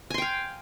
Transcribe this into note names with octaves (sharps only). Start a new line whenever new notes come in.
F5 G5 G#5 C6